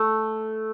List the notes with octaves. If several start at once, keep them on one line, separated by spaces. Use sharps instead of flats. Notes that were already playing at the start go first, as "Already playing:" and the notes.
Already playing: A3